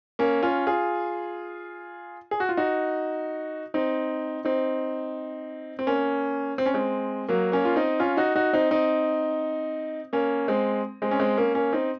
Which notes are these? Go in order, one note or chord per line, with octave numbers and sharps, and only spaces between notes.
A#3 C#4
C#4 F4
F4 G#4
G#4
F#4
F4
D#4 F#4
C4 D#4
C4 D#4
C4
A#3 C#4
C4
C#4
G#3 C4
F#3 A#3
A#3 C#4
F4
C4 D#4
C#4 F4
D#4 F#4
D#4 F#4
C4 D#4
C4 D#4
A#3 C#4
G#3 C4
G#3 C4
C#4
G#3 C4
A#3 C#4
A#3 C#4
C4 D#4